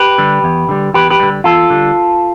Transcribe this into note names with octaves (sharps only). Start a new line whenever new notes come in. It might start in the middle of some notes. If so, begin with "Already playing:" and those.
Already playing: G4 B4
D3 G3
E2
D3 G3
E2 G4 B4
G4 B4
D3 G3
E2 F4 A4
D3 G3